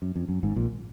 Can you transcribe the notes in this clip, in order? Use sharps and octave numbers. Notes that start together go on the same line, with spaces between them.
F#2
F2
F#2
G#1 G#2
A#1 A#2